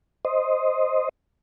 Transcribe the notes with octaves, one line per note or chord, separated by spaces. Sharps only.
C5 D#5